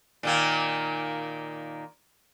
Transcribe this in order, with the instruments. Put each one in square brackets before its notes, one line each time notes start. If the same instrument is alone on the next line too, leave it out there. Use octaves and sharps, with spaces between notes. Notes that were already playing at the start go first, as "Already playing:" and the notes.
[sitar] A#2 D#3 A#3